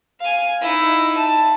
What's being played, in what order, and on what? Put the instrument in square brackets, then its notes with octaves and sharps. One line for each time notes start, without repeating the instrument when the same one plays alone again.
[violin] F5 G#5
D#4 E4
A5